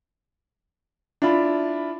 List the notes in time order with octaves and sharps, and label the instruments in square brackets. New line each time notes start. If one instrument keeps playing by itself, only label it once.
[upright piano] D4 E4 F4 B5